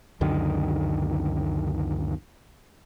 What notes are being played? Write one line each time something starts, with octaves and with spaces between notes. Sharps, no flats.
C#2 F#2 D3 D#3